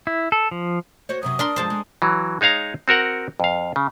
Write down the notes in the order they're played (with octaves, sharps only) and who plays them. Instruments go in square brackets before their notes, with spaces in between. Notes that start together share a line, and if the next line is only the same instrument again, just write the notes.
[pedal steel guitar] E4
A4
F3
[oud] F#4 C5 C#5
[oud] F#2 C3 F#3 [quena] D#6
[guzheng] D4 A#4 C6 [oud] D5
[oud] G2 F3 G#3 [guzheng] C5 A5
[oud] G#3
[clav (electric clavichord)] E3 F#3
G#3 D#4 C#5 F5 A#5
C4 F#4 A#4 F#5
F2 F5
C#3